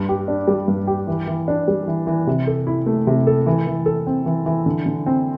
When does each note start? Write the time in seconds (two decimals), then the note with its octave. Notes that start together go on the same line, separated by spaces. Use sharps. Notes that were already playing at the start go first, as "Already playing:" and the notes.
Already playing: G2
0.09 G4
0.28 D4
0.47 G3
0.68 G2
0.87 G4
1.07 E3
1.27 E3
1.48 D4
1.68 G3
1.88 E3
2.07 E3
2.27 C3
2.47 A4
2.67 E4
2.86 A3
3.07 C3
3.27 A4
3.46 E3
3.67 E3
3.86 A4
4.07 C4
4.26 E3
4.46 E3
4.66 D3
4.86 D3
5.06 C4